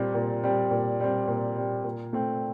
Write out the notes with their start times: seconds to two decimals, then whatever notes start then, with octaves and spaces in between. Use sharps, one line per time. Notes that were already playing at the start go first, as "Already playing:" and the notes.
Already playing: A#2 G3 C4
0.14 A#2
0.44 G3 C4
0.71 A#2
1.00 G3 C4
1.28 A#2
1.56 G3 C4
1.84 A#2
2.13 A3 C4